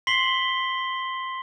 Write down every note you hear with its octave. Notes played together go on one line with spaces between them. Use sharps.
C6 B6 C7 F#7 G7